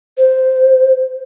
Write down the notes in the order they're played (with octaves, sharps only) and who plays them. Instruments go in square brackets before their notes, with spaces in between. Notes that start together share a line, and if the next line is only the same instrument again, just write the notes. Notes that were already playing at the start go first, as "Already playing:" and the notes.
[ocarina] C5